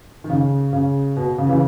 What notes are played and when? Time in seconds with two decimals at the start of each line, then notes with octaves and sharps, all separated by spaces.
0.24 D#3
0.30 C#3
0.73 C#3
1.17 B2
1.38 C#3
1.49 C#3 E3